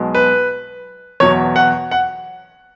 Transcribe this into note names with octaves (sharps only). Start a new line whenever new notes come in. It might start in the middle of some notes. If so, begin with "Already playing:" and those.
Already playing: B1 B2 G#3
B4
E2 B2 F#3 C#5
F#5
F#5